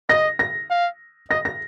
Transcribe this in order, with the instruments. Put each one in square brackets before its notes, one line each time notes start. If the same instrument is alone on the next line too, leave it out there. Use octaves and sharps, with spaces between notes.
[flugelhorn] D#5 [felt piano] A#6
[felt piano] A#6
[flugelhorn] F5
[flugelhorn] D#5 [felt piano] A#6
[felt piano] A#6